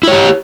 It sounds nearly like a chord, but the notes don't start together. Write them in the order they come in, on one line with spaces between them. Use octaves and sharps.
E4 C#5 G4